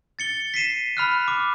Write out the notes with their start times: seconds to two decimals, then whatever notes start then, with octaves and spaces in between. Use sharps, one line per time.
0.19 A6 C#7 G7
0.54 B6 C7 D#7 E7
0.97 B5 F6 F#6
1.28 D6